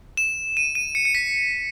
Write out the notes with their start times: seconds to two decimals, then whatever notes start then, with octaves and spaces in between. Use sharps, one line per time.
0.17 E7
0.57 D#7
0.75 D#7
0.95 C#7
1.05 C#7
1.15 B6